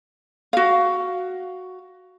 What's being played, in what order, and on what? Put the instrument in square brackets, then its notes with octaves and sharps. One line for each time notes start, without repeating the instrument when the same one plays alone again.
[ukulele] F#4 F5